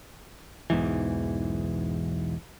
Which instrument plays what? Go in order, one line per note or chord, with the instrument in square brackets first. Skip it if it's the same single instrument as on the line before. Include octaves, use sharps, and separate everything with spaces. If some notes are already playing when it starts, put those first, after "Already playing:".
[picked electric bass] B1 E2 G#2 E3